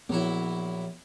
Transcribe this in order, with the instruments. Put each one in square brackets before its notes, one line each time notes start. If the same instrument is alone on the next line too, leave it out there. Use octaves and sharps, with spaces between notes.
[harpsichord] A#1 F#3 E4 [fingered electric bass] B3